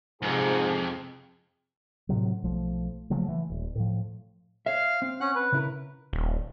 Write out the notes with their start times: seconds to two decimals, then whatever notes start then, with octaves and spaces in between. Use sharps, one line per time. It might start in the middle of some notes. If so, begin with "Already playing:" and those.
0.22 F2 G#2 C3 G#4
2.09 A2 C3 F#3
2.44 B1 F3 A3
3.10 C#3 F3 F#3 A3
3.28 E3
3.50 D#1
3.75 A2 F3
4.66 C#5 E5 F5 F6
5.02 C4
5.21 C#4 F#5 F#6
5.35 B4
5.52 C#3 E4 A#4
6.13 D#1